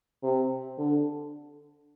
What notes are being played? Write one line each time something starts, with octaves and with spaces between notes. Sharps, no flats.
C3
D3